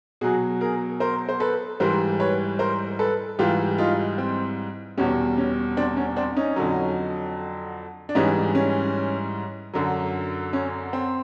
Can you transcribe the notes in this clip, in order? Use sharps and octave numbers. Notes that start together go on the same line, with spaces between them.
B2 F#3 F#4 G#4
G#4 A#4
A#4 C5
C5
A4 B4
G#2 E3 G3 A#4 C5
B4 C#5
A#4 C5
A4 B4
G#2 E3 G3 F4 G4
D#4 F4
C4
E2 B2 G3 C#4
C#4
C4 D4
C#4
C4 D4
C#4 D#4
F2 D3 F#3
D4
G#2 E3 G3 C#4 D#4
C#4
F#2 D3 F#3
C#4
C4